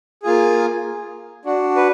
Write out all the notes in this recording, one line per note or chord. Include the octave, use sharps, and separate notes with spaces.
A#3 F4 G#4
D4 F#4
B4